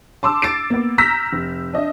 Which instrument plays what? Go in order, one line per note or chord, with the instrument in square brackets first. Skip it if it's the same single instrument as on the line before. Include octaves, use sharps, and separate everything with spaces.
[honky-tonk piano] A5 C6 D6 E6
A6 C7 D7
A#3 B3
A#5 E6 F6 G6 A#6 B6
F1
D4 D#5 E5